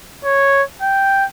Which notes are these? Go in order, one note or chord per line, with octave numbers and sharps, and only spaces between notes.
C#5
G5